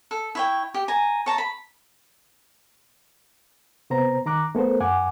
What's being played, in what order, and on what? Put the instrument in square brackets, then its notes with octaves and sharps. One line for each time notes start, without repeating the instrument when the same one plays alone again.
[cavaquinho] A4
E4 C#5 G5
G4
G#5 A#5
C#5 A5 A#5
B5
[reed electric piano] C3 B3 C5 A#5
D#3 A#5 D6 F#6
A3 B3 A4 A#4 C5
F#2 F#5 G#5 D6